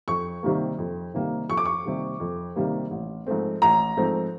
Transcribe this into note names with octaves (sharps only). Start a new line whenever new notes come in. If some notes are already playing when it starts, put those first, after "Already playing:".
F2 C#6
C3 D#3 G3 A#3
F2
C3 D#3 G3 A#3
F2 C#6
D6
C#6
C3 D#3 G3 A#3
F2
C3 D#3 G3 A#3
A1
G#2 F3 A3 C4
A1 A#5
G#2 F3 A3 C4